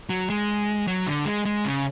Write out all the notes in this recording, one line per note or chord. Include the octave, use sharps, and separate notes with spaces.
F#3
G#3
F#3
D3
G#3
G#3
C#3